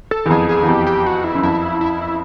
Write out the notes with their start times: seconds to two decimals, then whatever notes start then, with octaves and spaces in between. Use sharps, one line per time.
0.11 A4
0.26 E2
0.30 F2 G#4
0.49 G#4
0.63 E2
0.68 F2 G4
0.87 G4
1.06 F#4
1.24 E4
1.35 F#2
1.43 F2 E4
1.81 E4